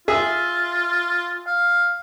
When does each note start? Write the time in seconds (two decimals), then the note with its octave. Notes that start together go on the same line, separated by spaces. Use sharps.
0.08 F4 G#4 E5 G#5
1.47 F5